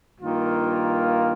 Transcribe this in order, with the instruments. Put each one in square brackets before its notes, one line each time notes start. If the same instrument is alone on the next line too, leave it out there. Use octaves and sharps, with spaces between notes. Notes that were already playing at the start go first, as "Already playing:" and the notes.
[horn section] G2 D#3 A#3 F4